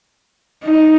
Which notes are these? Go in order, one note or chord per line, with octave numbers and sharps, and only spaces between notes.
D#4